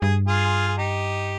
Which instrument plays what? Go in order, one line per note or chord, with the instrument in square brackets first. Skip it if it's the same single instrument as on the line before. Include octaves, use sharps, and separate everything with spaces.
[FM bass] G2 [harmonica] G#4
[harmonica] F4 G#4
G#4
D#4 G4